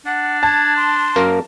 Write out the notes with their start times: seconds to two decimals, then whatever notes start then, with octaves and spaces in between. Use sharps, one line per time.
0.06 D4 F#5
0.43 A5 G#6
0.76 C6
1.16 F#2 A#3 A#4